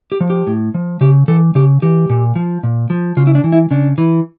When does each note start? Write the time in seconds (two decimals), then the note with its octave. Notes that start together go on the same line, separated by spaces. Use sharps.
0.12 G4
0.21 F3
0.30 G4
0.47 A2
0.74 F3
1.01 C#3 G4
1.28 E3 A4
1.55 C#3 G4
1.82 E3 G4
2.10 A#2
2.36 F3
2.63 A#2
2.90 F3
3.17 C#3 F4
3.27 E4
3.35 D4
3.44 E3
3.52 E4
3.71 C#3 D4
3.98 E3